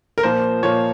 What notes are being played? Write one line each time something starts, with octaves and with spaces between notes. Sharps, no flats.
A#4
A#2 F3 A#3 C5
A#2 F3 A#3 C#5